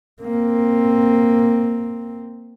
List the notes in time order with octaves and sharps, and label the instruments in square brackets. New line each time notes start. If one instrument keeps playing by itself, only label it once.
[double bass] A#3 C4